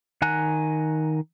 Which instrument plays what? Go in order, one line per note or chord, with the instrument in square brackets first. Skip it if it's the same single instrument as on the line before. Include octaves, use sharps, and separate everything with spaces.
[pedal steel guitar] D#3 F#5 G#5 A#5 F#6